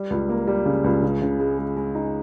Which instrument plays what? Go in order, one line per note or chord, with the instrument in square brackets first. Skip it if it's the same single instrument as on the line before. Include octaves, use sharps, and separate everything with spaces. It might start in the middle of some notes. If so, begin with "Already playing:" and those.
Already playing: [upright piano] G3
C#2
A#3
G3
C#3
C#2
C#3
C#3
G#3
G#3
G#3
D#4